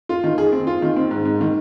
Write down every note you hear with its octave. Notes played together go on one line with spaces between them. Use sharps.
F4
D#3
G#4
C4
F4
D#3
C4
G#2
G#2
D#3